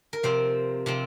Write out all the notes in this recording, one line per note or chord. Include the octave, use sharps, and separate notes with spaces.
A#4
C3 F3 C4 C5
C3 F3 C4